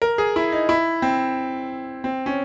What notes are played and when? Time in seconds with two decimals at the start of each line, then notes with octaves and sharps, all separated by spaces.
0.02 A#4
0.18 G#4
0.36 E4
0.52 D#4
0.69 E4
1.02 C4
2.04 C4
2.26 C#4